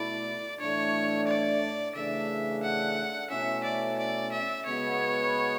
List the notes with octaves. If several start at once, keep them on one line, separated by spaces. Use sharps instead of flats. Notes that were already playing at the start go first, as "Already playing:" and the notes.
Already playing: B2 A3 E4 D5
A2 E3 A3 D4 C#5
D5
C#3 E3 A3 D4 E5
F#5
B2 A3 C#4 E4 E5
D5
D5
E5
C#3 G#3 B3 F#4 C#5